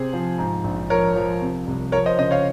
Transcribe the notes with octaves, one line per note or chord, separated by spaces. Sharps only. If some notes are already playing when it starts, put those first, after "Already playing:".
Already playing: C3 G#4 C5
F3
G#2
A#1
F3 A#4 C#5
F3
C3
C2
F3 A#4 C#5
C5 D#5
C#3 C5 D#5
C#5 F5